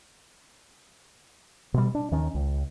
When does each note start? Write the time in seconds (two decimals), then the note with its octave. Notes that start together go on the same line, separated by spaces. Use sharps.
1.74 B2 G3
1.95 D4
2.11 D#2 D#3 C#4
2.35 C#2